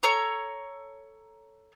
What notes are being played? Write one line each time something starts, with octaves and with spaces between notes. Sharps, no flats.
A4 C#5 A#5 C#6